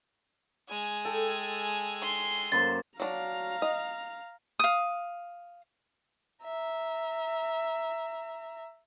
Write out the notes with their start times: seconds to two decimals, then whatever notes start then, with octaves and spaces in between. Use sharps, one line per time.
0.69 G#3 G#5
1.05 A4 G5
2.03 C6
2.52 F#2 A#3 C5 A6
3.00 F#3 D4 F5 A#5
3.62 D#5
4.59 F5 D#6
6.44 E5 A#5